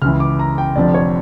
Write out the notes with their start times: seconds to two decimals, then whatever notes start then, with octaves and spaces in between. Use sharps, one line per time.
0.02 C#2 C#3 E3 F6
0.20 D6
0.39 A#5
0.58 G5
0.76 F1 F2 D3 F3 D5
0.94 C#5